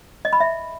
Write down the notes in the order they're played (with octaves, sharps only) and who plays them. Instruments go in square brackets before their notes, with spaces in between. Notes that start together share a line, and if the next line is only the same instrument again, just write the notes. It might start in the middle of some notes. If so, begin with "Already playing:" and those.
[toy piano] D#5
B5
E5